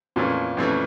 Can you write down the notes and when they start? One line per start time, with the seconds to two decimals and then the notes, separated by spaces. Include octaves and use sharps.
0.16 F2 A#2 E3 A3 C#4
0.57 F2 E3 A3 C#4